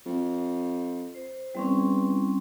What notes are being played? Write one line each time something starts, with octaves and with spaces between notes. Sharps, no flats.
F2
C5
E2 G3 C4 C#4